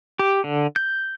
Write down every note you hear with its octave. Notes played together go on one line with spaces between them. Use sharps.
G4
D3
G6